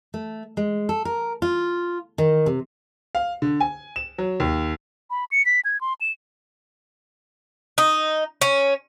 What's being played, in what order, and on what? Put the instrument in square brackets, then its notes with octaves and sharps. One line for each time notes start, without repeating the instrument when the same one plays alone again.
[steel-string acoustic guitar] A3
G#3
A4
A#4
F4
D#3
C3
[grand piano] F5
D3
G#5
E7
F#3
D#2
[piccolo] B5
C#7
B6
G#6
C6
E7
[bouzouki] D#4
C#4